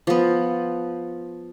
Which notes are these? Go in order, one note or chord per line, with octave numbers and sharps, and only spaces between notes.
F3 B3